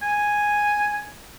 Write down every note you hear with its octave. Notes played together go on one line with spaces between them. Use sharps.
G#5